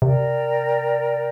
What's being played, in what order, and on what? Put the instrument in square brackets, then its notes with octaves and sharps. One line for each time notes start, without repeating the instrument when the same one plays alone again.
[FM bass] C3 [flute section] A#4 D5 G5